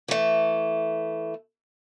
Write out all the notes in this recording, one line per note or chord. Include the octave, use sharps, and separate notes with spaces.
E3 A3